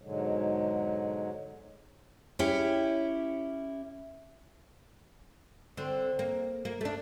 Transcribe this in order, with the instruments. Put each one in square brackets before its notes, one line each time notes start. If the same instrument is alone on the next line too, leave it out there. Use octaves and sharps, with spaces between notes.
[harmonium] G#2 B2 D3 F#3 G#3
[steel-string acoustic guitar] C#4 E4 G4
[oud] D3 C4
A#3
A#3
A3 D4